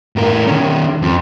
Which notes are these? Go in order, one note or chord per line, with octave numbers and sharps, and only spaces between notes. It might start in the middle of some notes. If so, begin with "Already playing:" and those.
A2 A#4
D#3 C#4
F2